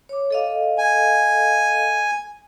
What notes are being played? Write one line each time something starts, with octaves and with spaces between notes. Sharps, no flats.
C#5 D6
A4 D#5 F5
G#5